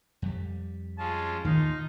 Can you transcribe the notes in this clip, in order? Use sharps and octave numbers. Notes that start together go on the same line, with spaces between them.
F2 G3
G#3 C#4 F4 A5
D#2 A2 D#3 D#4 F4